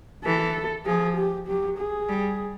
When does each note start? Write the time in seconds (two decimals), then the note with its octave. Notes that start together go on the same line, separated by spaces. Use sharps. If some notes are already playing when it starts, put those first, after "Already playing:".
0.25 E3 A4
0.86 F3 G#4
1.17 G4
1.48 F#3 G4
1.78 G#4
2.08 G3